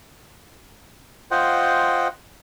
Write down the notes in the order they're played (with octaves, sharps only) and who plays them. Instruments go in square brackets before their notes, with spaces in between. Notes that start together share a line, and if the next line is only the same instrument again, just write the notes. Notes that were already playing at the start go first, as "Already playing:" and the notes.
[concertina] F4 C5 D#5 F#5 G5